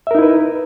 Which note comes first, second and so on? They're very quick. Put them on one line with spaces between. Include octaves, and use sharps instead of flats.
E5 A#4 D#4 E4 B4